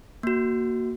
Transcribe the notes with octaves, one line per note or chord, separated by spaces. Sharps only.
A#3 F#4